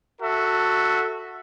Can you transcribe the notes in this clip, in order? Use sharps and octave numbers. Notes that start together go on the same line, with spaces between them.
F#4 A4 E5